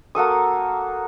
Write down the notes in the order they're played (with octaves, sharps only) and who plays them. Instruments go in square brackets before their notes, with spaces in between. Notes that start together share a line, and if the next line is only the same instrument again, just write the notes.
[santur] A#3 F#4 A4 D#6